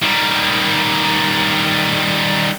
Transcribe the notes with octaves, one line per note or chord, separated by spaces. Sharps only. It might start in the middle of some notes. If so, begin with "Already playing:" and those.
D#3 G3